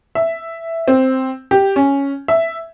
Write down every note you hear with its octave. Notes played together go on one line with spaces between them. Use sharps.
E5
C4
G4
C#4
E5